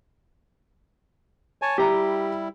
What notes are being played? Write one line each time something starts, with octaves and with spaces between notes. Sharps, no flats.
C#5 G#5 A5
G3 E4 G4 A#5